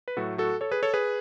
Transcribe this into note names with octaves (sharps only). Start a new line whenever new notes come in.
B4
A2 F#3 A3 F#4 A4
F#4 A4
A4 C#5
G#4 B4
A4 C#5
G#4 B4